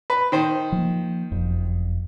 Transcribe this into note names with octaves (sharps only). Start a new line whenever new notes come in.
B4
D#3 C5
F3 A#3
F#1 F2